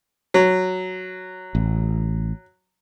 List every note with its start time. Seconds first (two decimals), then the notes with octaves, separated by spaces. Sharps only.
0.34 F#3
1.55 A1